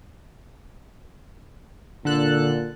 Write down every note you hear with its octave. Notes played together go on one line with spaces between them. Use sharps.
A#2 D3 A4 F#6